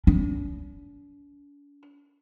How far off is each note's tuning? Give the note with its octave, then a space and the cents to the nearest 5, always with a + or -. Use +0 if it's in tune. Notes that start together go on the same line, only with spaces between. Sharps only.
D4 -45